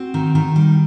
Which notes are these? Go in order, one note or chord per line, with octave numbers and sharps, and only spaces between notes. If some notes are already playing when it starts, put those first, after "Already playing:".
Already playing: C4 F#4
D#3
D#3
G3